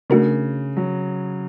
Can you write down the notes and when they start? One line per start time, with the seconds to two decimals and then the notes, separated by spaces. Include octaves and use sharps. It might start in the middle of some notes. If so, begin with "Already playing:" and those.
0.10 C#3 A3 D4 F#4 A#4
0.77 F#3